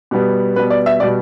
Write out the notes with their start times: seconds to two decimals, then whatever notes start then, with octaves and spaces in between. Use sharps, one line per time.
0.11 B2 G3 B3
0.56 B2 G3 B3 B4
0.70 D5
0.86 E5
1.00 B2 G3 B3 D5